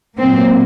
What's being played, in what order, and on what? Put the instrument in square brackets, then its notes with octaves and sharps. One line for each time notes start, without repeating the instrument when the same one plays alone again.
[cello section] A#2 F#3 A#3 C4